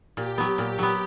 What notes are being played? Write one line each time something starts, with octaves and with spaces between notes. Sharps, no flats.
A#2 G4
F#3 B3
A#2
F#3 B3